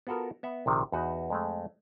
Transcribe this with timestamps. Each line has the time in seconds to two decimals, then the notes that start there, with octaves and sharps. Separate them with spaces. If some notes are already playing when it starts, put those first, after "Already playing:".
0.07 B3 F4 F#4 A4 A#4
0.43 B3 E5 F#5
0.66 A#1 C3 D#3
0.92 E2 D#4 F#4 B4
1.30 F2 G#3 A3